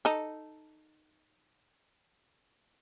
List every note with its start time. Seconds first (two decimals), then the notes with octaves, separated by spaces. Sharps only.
0.05 D#4 A4